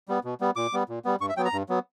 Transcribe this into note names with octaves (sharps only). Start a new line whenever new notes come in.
G3 B3
B2
G3 B3
A#2 D6
G3 B3
A#2
G3 B3
G2 C#6
E5
F#3 B3 G5
A#5
G2
F#3 B3